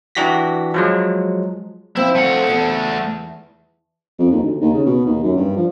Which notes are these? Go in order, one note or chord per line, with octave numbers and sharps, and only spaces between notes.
E3 D4 F#4 G4 A#6 B6
F3 F#3 G#3
F3 C4 E4 C5
A3 F#5
E2 A5
F2
D#2
D2
D#2
C#3
B2
D#2
F#2
G2
F3